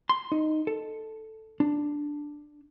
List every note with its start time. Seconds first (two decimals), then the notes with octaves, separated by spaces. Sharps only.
0.09 C6
0.32 D#4
0.67 A4
1.60 D4